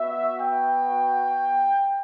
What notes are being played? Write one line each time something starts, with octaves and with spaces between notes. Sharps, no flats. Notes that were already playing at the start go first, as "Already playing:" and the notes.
Already playing: B3 F#4 E5
G5